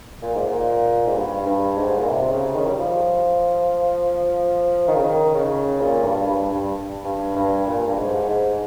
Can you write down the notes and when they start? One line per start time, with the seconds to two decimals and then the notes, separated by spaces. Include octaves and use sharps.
0.22 A#2
0.35 G#2
0.47 A#2
1.06 G#2
1.15 G2
1.46 G2
1.77 G#2
1.97 A#2
2.09 C3
2.31 C#3
2.55 D#3
2.67 G3
2.78 F3
4.88 D#3
4.96 C#3
5.03 D#3
5.34 C#3
5.80 A#2
6.04 G2
6.27 G2
6.51 G2
7.05 G2
7.36 G2
7.67 A#2
7.88 G2
7.98 G#2
8.29 G#2